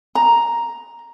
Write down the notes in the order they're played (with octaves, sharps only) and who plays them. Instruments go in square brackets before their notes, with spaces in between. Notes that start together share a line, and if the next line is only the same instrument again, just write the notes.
[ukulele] A#5